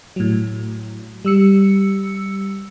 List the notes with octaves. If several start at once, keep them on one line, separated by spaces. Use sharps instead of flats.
A2 F#3
G3 E6 C#7